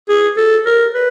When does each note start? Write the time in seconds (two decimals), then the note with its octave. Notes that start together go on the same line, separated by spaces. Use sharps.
0.09 G#4
0.37 A4
0.66 A#4
0.94 B4